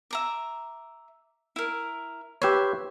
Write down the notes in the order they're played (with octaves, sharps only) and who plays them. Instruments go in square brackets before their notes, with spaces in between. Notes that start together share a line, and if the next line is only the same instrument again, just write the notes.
[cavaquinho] E5 A#5 D6
E4 A#4
[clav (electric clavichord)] G4 B4 C#5 [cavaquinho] E5 C6